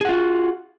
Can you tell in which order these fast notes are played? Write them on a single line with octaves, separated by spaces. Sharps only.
G#4 F#5 F4 F#4